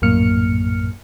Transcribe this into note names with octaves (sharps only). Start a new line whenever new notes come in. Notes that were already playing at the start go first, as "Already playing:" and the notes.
A#1 F#2 A2 A#3 F6 C#7